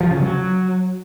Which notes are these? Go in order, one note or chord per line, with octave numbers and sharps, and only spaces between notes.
F3
C#3
F#3